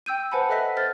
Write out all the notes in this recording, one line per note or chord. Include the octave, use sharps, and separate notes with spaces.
G5 E6 G6 D#7
B4 C5 F#5 G#5 A5 B5
A4 D#5 E5 F#6 A#6 B6
C5 F6 A6